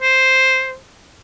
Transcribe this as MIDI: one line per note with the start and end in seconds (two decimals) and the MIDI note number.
0.02 0.76 72